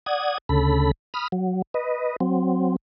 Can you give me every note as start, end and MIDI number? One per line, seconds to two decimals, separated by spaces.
0.06 0.38 74
0.06 0.38 78
0.06 0.38 87
0.06 0.38 92
0.49 0.91 38
0.49 0.91 49
0.49 0.91 69
0.49 0.91 83
1.14 1.28 83
1.14 1.28 87
1.14 1.28 89
1.32 1.62 54
1.74 2.16 71
1.74 2.16 75
2.20 2.76 54
2.20 2.76 60